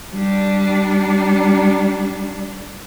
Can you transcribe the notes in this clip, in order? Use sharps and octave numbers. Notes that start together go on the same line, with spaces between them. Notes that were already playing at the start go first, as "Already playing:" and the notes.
G3 D4